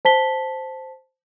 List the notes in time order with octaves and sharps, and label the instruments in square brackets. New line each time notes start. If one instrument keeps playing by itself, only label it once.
[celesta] C5 A5 B6 G7